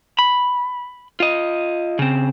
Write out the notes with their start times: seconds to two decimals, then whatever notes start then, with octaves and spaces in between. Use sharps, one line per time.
0.19 B5
1.20 F4 D#5
1.99 C#3 C4